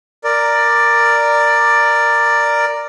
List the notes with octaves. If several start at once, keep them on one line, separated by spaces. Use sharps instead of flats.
A#4 D5